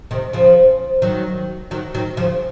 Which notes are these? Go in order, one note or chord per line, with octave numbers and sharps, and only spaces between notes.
C3 D#3
C#3 F3
D#3 F#3
D#3 F#3
D#3 F#3
C#3 F3